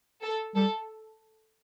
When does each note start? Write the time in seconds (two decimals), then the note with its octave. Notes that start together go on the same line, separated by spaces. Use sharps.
0.22 A4
0.55 G3 A4